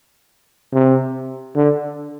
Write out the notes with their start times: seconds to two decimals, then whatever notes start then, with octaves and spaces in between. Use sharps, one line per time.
0.73 C3
1.56 D3